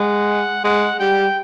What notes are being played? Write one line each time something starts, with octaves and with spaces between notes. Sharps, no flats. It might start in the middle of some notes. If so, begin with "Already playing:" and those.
Already playing: G#3 F#5
G#3 F#5
G3 G5